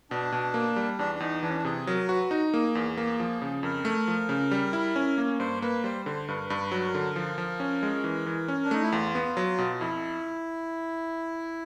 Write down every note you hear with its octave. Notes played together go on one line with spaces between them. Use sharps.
B2 D4
B2
A#3
G3
E2 D4
D4
E2 D#4
E3 D4
C#4
D4
C3 G#4
F#3 A#4
F#4 B4
D#4
A#3 G#4
E2
A#3
F3
C#3
F2 A#4
A3
F3
C#3
G3
E4
C#4
A#3
G2 C5
A#3 B4
G3 C5
D3 C5
G2 B4
A#4
B4
G2
B4
F#3
A#4
D3
F3
F3
C#4
G#3
E3
E3
C#4
D4
A3 D#4
E4
E2 F4
B3
F#3
B2
F2 E4